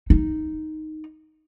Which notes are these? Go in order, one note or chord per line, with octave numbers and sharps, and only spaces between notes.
D#4